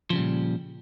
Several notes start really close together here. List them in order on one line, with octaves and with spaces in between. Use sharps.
F3 C#3 G3 A#2